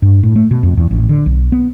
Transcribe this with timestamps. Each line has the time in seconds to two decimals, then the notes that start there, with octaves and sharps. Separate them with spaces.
0.02 G2
0.23 A2
0.36 A3
0.51 B2
0.63 F2
0.77 E2
0.91 A1
1.09 D3
1.26 B1
1.52 B3